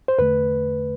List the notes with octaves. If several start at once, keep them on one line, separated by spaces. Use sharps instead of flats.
C5
E2 D3 A3 B4